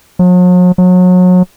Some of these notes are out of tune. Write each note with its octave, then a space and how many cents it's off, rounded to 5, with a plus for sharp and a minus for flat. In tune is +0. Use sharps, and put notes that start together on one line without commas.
F#3 -45
F#3 -30